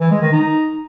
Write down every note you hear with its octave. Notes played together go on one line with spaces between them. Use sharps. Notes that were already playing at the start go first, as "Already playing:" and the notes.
E3
G#3
D#3
D#4